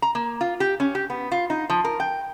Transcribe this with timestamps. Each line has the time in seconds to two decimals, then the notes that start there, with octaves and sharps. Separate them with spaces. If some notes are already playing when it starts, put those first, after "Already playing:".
0.02 A#5
0.15 A#3
0.41 F4
0.60 G4
0.80 C#4
0.95 G4
1.10 B3
1.32 F4
1.50 D#4
1.70 F3
1.85 A#4
2.00 G5